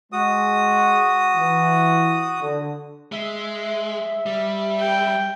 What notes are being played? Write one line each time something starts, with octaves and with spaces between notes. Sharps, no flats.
G#3 F#4 D#6
E3
D3
G#3 E5
G3
G5